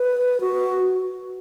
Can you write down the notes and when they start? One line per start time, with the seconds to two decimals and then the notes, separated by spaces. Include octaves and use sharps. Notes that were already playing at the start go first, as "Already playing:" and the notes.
Already playing: B4
0.41 F#4